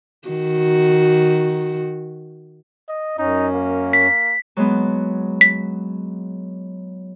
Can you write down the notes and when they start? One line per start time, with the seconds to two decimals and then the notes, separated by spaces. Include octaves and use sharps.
0.28 D#3 F#4
2.88 D#5
3.18 F#2 C#4 D#4
3.55 A#3
3.93 B6
4.57 F#3 G#3 B3
5.41 B6